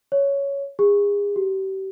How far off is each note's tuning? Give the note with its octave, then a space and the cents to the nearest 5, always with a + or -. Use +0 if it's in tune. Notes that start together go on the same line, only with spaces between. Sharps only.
C#5 +5
G#4 -35
G4 -35